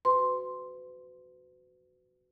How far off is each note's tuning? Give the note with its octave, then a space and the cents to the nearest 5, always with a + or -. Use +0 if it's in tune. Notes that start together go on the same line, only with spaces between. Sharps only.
F#4 +0 B4 +40 C6 +0